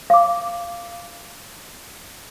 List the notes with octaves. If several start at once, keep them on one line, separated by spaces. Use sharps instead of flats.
F5 D6